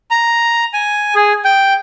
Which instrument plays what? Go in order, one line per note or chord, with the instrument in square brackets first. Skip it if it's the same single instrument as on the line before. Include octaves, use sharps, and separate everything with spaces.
[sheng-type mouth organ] A#5
G#5
G#4
G5